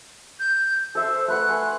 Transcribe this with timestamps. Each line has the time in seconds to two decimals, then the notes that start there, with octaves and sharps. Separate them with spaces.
0.40 G6
0.95 A4 C5 E5
1.28 A3 B4 F#5 F#6
1.49 G#5 C6